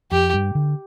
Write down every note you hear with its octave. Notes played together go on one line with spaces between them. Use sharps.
F2 G4
G2
D3